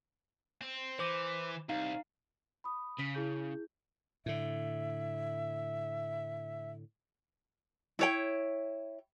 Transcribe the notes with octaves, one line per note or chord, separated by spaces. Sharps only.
C4
E3 C5 D6 A#6
C2 D#4 F5
B5 D#6
C#3 B6
E4 G#4 G6
A2 D3 E5
E4 C#5 G5